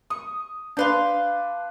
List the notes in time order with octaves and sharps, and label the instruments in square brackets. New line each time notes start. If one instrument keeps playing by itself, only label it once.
[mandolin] C#6 [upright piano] D#6
[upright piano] D4 B4 [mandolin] F5 C6 G6